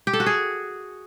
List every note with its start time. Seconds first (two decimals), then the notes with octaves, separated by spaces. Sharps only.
0.07 G4
0.13 A4
0.20 F#4
0.26 G#4